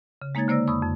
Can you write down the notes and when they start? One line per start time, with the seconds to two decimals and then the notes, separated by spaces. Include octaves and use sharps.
0.22 C#3
0.35 G#3 A#3 D#4 C#5 G#6 A6
0.48 D3 A#3 C5 D5 E6 A#6
0.68 F2 B5 C#6 D#6 E6
0.82 F2